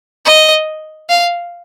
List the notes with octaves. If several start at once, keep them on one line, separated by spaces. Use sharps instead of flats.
D#5
F5